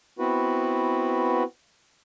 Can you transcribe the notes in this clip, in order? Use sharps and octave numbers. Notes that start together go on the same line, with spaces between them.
B3 C4 E4 F#4 B4